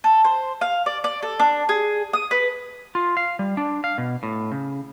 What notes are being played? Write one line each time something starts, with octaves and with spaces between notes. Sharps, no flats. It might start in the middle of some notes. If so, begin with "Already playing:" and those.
A4
C5
F5
D5
D5
A4
D4
G#4
D#6
B4
F4
F5
G3
D4
F5
B2
A2
C#3